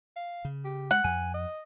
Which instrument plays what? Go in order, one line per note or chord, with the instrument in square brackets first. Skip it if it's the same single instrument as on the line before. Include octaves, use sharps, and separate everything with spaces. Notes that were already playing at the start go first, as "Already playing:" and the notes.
[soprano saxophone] F5
[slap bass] C#3
[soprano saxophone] G4
[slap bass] G#3 [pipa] F#5
[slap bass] F2 [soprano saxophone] G#5
[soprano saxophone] D#5